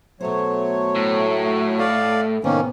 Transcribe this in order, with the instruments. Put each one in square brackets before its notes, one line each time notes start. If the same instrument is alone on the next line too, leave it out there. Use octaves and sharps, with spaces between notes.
[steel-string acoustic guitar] B2 C5 [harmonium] F#3 A3 C#5
[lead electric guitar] A2
[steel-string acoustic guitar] A4 [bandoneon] D5 F5
[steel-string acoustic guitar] A2 C3 B3 [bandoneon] D#3 A#3 C#4